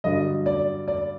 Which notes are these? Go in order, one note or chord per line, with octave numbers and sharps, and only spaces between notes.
G2 D3 F#3 D#5
D5
D5